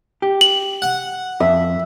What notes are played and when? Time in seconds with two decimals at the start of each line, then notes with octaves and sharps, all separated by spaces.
0.22 G4
0.41 F#7
0.82 F#5
1.40 F2 E5